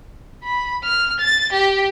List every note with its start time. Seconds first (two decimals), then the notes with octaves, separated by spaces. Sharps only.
0.43 B5
0.83 F6
1.19 A6
1.52 G4